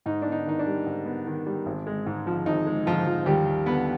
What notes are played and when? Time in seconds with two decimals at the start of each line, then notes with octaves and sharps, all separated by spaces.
0.06 G#2 D#4
0.22 B3 D4
0.32 D#4
0.46 D#3 D#4
0.59 D4
0.67 G3
0.86 G#2
1.06 B3
1.26 D#3
1.46 G3
1.66 G#1
1.87 G#3
2.06 G#2
2.27 F3
2.46 G#1 D#4
2.67 G#3
2.86 G#2 F3 F4
3.06 F3
3.26 D#2 G3 G4
3.46 D#2
3.66 D3 B3 B4